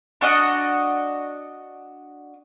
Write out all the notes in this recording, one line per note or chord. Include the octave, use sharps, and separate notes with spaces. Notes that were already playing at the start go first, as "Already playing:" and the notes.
D4 F#4 D#5 F#5